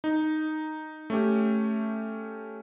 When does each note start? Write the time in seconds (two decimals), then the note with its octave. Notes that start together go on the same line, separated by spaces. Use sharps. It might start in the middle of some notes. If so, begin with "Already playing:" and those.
0.04 D#4
1.10 A3 C#4 G4